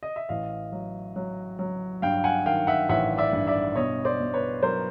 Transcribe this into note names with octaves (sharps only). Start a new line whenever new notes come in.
D#5
E5
A1 D#5 F5
F#3
F#3
F#3
G2 F5 G5
F#5 G#5
D#3 F5 G5
E5 F#5
A1 E5 F#5
D5 E5
G2
D5 E5
B2 C#5 D#5
C5 D5
B2
B4 C#5
F#3 A#4 C5